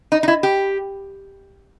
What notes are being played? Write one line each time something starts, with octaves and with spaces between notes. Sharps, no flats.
D#4
D#4
E4
G4